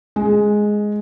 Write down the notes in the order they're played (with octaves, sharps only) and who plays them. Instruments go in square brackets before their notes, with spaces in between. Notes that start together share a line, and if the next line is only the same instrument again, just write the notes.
[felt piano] G#3